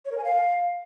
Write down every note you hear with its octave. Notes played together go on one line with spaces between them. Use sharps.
C#5
A#4
G#5
F5